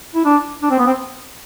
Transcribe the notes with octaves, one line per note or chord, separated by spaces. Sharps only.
E4
D4
D4
C4
B3
C4